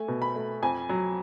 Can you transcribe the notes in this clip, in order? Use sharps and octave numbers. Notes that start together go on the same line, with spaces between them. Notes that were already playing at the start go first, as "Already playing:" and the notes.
Already playing: A3 G#5
B2
B5
A3
F2 G#5
F#3